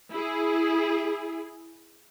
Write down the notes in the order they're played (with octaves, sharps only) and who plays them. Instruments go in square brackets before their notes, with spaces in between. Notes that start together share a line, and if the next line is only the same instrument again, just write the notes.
[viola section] E4 G#4